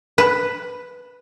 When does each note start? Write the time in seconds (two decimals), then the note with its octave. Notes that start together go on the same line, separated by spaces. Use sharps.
0.18 B4